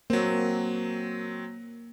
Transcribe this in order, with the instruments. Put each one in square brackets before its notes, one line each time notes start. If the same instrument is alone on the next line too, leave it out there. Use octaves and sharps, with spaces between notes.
[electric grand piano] F#3 C4 [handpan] A#3